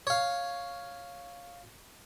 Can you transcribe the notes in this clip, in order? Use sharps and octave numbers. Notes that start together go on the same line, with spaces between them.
C#5 F5